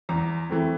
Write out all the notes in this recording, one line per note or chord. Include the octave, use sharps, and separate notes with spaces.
E2 A#5
E3 A3 C4